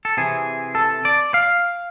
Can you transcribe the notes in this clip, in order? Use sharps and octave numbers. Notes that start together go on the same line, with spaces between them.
A4
C3 E3 G#4
A4
D5
F5